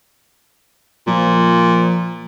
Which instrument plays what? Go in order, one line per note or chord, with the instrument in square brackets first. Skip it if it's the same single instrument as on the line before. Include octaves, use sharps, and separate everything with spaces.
[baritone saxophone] A#2 [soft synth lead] F3